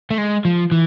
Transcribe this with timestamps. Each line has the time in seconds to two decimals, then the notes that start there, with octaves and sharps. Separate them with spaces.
0.11 A3
0.18 G#3
0.45 F3
0.72 E3